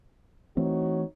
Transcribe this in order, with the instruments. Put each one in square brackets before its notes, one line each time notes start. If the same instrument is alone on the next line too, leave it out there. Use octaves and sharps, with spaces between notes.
[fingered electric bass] E3 A3 C4 [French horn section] D#4 F#4 C#5